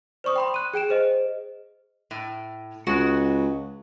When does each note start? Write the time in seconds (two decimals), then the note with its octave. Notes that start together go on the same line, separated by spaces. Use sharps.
0.24 C5 D5 C#6 D#6
0.36 G5 B5 C6
0.54 F#6 D#7
0.74 G#4 G5 D7 E7
0.89 G#4 C5 D#5
2.11 A2
2.87 C#2 G#3 F#4 F#5